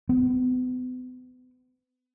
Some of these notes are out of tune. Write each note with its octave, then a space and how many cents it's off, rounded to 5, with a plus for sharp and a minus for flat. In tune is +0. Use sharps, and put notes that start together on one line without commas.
B3 +40